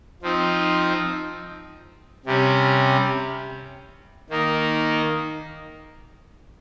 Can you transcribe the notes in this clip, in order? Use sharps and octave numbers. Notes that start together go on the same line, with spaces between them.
F3 C4 D#4
C3 G3 C#4
D#3 A#3 D#4